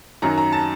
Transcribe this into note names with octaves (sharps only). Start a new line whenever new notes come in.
F#2 D#3 F#3 A#5
A#5
A5